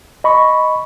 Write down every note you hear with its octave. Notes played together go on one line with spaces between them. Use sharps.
D#5 B5 C#6